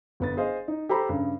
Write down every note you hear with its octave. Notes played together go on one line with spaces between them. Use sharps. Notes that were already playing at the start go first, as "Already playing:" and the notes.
G1 B3 A6
G#4 C5 D#5 F5
D#4
G4 A4 C5 A#5 B5
G2 C#3